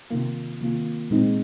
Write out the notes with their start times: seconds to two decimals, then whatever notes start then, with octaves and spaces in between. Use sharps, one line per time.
0.10 C3 D#3 A#3 F4
0.60 C3 D#3 A#3 F4
1.11 A#2 G#3 C4 D#4